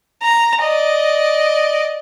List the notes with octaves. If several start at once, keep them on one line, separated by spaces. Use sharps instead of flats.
A#5
D5 D#5